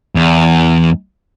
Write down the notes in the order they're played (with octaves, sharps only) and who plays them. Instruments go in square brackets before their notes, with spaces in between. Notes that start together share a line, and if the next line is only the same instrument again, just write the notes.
[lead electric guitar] E2